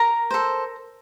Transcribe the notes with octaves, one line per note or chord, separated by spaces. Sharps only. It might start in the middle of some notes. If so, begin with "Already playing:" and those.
Already playing: A#4 A#5
A4 C5